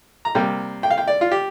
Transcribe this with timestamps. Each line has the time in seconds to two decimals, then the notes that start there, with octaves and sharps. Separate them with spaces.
0.25 A#5
0.35 C3 G3 A#3 G5
0.83 G5
0.90 F5
0.98 G5
1.08 D5
1.21 F4
1.31 G4